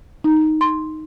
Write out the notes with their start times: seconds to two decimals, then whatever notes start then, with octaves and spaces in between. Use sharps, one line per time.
0.24 D#4
0.61 C6